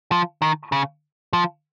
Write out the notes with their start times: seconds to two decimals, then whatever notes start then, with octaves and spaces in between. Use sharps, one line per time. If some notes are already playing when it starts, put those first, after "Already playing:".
0.12 F3
0.42 D#3
0.72 C#3
1.33 F3